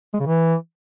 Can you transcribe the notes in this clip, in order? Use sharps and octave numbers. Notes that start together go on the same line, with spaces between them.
G#3
C#3
E3